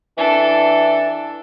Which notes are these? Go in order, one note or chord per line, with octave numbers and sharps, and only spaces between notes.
E3 D4 A4